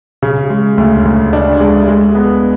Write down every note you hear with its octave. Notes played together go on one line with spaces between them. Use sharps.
C#3
G#3
D2
D2
D4
G#3
G#3
B3